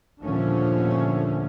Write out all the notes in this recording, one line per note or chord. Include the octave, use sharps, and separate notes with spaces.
D#2 A#2 D3 F3 A3 C#4